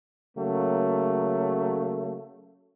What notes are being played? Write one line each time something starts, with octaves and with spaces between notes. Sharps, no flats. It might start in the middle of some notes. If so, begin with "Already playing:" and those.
C#3 F#3 A3 A#3